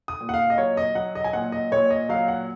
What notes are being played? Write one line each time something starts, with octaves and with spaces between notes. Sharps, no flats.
D#6
A#2
F#5
F5
D#5
F#3 C#5
D#5
F#3 F#5
D#5
G#5
A#2 F#5
D#5
A#2 C#5
D#5
F#3 F5
F#5